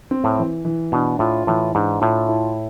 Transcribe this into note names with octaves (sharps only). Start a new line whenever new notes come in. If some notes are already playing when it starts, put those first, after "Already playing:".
C4
A2
E3
E3
B2 D4
A2 F4
A2 E3
G#2 D4
A2 F4
E4